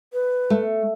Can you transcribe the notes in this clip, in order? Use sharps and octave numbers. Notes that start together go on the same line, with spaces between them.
B4
A3